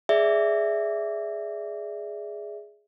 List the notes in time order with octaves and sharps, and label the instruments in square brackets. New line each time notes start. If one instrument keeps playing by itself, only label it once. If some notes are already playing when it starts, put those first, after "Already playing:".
[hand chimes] G#4 D5 E5